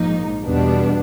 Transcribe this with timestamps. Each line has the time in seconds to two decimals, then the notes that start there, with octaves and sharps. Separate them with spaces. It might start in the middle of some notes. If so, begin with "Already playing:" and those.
Already playing: A#1 G#2 F3 A#3 D#4
0.44 E2 B2 G3 B3 D4